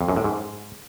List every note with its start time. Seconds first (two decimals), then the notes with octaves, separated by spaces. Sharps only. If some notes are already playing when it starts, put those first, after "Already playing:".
0.01 F2
0.09 F#2
0.16 A2
0.24 G#2